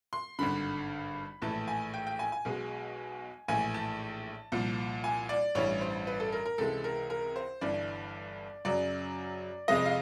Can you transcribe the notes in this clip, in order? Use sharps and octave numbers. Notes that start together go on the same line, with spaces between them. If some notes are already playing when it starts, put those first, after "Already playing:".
C6
G#1 G2 D3 B5
A#1 A2 E3 A5
G#5
G5
G5
G#5
G#5
B1 B2 G#3
A#1 A2 E3 G#5
A5
C2 A#2 F3
G#5
D5
A1 G2 E3 G3 C#5
C5
B4
A4
A#4
A#4
C#2 C3 E3 G#3 A4
A#4
A#4
C5
G1 G2 E3 D5
F#2 C#3 F#3 D5
F2 C3 F3 G#3 D#5
F5